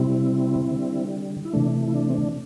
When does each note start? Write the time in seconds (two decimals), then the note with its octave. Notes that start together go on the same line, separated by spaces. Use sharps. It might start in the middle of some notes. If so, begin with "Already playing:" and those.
Already playing: C3 G3 C4 E4
0.71 D3 G3
1.45 E4
1.53 C3 E3 A3 D4
1.88 E4
1.94 D4
2.09 C4
2.14 D4